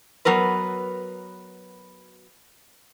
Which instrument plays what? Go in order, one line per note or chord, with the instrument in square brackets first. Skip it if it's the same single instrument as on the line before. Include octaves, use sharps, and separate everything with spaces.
[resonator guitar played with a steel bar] F#3 B3 A#4 B4